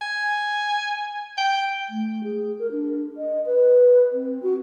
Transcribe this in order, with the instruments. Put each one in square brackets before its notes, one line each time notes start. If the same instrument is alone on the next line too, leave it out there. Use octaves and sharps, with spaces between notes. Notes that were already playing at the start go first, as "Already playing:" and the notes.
[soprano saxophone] G#5
G5
[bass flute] A3
G#4
A#4
D4
D#5
B4
C4
F#4